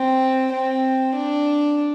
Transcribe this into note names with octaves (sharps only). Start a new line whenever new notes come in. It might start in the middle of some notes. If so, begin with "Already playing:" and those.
Already playing: C4
C4
D4